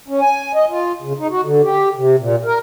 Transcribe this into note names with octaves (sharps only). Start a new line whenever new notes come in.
C#4
G#5
D#5
F4
C#3
D#4
F#4
D3
G4
C3
A#2
A#4